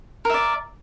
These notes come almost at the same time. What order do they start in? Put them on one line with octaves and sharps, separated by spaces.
A#4 E5 D5